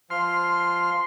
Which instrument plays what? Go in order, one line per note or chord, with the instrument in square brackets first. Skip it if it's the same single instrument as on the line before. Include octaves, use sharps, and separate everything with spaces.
[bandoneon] F3 F6 [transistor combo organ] C6